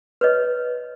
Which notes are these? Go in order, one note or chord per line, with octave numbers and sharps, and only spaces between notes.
B4 C#5 D#5